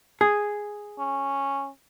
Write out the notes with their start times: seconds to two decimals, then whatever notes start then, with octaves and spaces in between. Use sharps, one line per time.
0.21 G#4
0.99 C#4